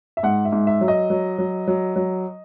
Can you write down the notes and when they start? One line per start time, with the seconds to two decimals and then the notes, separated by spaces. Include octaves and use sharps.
0.17 E5
0.23 G#2 F#5
0.45 E5
0.52 G#2
0.67 E5
0.81 F#3
0.88 D#5
1.10 F#3
1.38 F#3
1.68 F#3
1.96 F#3